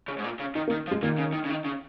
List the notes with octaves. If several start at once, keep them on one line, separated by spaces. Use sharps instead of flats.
C#3
G#2
A#2
C#3
D#3 D#4
A#3
D#3
F3
G#3
A#2 D#3
C#3
D#3
C#3
D#3
C#3